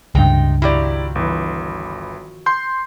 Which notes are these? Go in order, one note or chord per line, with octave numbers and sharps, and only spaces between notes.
C#2 G2 C3 D#4 G5
D#3 F3 F#3 E4 G4 D5
G1 E3
C6 G6